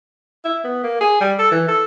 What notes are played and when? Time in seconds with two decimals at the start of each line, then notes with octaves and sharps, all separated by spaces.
0.44 E4
0.64 B3
0.84 A#3
1.01 G#4
1.20 G3
1.39 A4
1.51 E3
1.68 A4